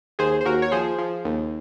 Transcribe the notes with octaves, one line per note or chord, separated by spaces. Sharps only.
D#2 G#4 C5
C5
D#2 F#4 A#4
C#5
F3 G#4 C5
F3
D#2